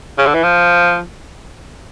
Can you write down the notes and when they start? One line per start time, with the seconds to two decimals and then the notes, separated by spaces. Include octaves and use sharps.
0.18 C#3
0.26 D3
0.34 E3
0.43 F3